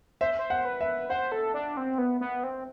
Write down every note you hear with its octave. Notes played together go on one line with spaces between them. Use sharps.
C5 E5
C5
F#5
B4
E5
C5 F#5
A4
D4
C4
B3
B3
C4